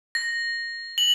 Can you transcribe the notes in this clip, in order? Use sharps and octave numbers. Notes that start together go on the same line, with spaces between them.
A#6
F#7